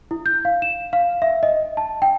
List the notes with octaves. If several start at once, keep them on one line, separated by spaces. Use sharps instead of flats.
E4
G6
F5
E7
F5
E5
D#5
A5
G5